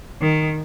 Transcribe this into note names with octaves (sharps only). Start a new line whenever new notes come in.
D#3